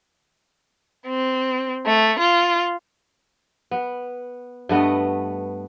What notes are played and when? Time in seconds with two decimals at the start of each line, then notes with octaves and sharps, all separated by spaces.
1.06 C4
1.85 A3
2.19 F4
3.71 B3
4.69 G2 A3 B3 D#5